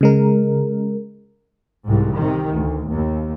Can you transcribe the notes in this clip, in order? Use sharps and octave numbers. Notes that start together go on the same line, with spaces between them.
C#3 G#3 A#4
C2 G#2
C3 D#3
D2
D#2